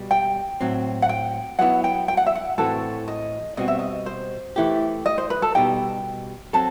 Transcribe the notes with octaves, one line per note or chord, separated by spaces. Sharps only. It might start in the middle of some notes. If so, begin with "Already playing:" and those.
Already playing: B2 G3
G5
A2 F#3 C4
F#5
G5
F#3 B3 E4 F#5
G5
G5
F#5
E5
F#5
A2 E3 A3 C4 F#4 A4
D#5
B2 G3 C4 F#4 D#5
E5
D#5
C5
E3 A3 E4 G4
D#5
C5
B4
A4
B2 G3 D#4 G4 G5
F#3 C4 A4 A5